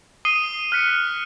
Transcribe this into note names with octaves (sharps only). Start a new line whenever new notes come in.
D#6 C7 D#7 G7
F6 F#6 B6 C#7